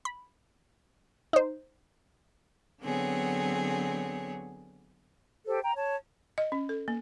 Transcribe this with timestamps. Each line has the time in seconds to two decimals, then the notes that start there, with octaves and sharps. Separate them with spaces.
0.05 B5
1.33 D#4 C5
2.80 D3 F#3 B3 C4 G#4 C#5
5.46 G4 A4 C5
5.62 G5 A#5
5.75 C#5 A5
6.38 D#5
6.52 C#4
6.69 A4
6.88 A#3